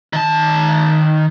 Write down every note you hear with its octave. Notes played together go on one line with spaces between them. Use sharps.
D#3 A5